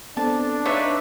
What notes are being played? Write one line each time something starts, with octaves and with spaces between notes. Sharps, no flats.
B3 C4 D4 A4 A5
D#4 B4 C#5 D5 E5 F5